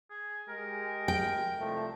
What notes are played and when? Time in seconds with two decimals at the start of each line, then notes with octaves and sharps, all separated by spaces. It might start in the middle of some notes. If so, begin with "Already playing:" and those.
0.10 G#4
0.48 G#3 G4 G#4 A#4
1.08 G5
1.58 C2 F3 A3